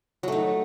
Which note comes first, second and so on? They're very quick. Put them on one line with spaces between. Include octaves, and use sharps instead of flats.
F#3 A3 D#4